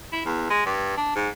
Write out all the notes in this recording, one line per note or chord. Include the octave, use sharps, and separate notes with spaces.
E4
E2
G#3
G2
D4
G#2